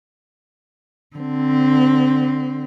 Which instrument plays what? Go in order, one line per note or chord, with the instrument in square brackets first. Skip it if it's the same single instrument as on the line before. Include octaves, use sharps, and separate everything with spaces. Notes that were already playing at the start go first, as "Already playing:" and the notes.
[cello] D3 C4